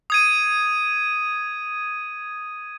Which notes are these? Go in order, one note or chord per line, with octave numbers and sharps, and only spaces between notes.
D#6 G#6 D#7